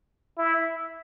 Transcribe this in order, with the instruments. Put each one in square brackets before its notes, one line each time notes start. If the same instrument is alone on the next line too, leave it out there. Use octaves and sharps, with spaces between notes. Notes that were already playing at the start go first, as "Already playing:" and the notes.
[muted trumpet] E4